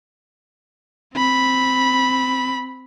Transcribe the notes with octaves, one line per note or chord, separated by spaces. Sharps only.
C4 B5